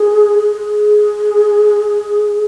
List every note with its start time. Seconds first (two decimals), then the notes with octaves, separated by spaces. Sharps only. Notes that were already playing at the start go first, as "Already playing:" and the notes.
Already playing: G#4
0.39 G#4